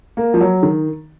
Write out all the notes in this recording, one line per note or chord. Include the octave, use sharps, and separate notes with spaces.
A#3
F3
F#3
D#3